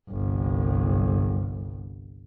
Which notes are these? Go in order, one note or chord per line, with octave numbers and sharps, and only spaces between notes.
G1 C2